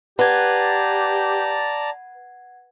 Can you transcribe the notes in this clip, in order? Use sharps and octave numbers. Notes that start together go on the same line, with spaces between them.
G4 B4 D5 F#5 A5 A#5 G#6